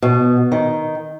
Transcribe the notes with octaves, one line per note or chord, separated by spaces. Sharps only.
B2
D#3